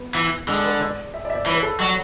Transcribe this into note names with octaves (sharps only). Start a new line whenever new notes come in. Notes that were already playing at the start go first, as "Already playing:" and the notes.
Already playing: B3
E3
D3 G#3
B4
D5
E5
D5
E5
D5
E3 C#5
B4
A4
F#3 D5